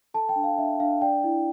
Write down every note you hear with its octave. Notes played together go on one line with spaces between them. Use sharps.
A4 A5
G5
D4
F5
D4 E5
D4 F5
D5 G5
E4